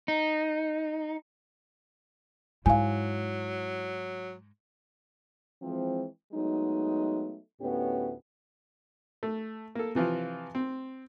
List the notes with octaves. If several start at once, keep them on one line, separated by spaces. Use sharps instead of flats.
D#4
G#2 F#3 E4 F5 G#5
E3 F3 G#3 C4
F#3 G#3 A3 B3 D#4
D2 A2 B3 C#4 G4
A3
A#3 A4
C3 E3 F3 F4
C4